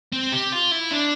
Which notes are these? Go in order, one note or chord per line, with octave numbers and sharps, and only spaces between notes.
C4
G4
F4
E4
D4